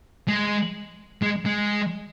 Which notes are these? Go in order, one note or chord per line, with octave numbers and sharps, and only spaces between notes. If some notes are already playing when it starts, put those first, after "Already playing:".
G#3
G#3
G#3